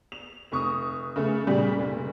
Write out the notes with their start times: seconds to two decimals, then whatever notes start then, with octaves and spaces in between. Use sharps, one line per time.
0.12 F7
0.52 F1 C#6 D#6
1.16 C#3 A3
1.47 A#2 C#3 G3
1.78 F1